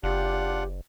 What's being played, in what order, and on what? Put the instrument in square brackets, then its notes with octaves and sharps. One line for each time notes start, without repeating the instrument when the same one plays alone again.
[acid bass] F#1 [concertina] D4 F4 F#5 [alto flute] G4